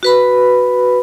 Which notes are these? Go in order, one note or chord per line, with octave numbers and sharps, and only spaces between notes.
F#4 B4 B5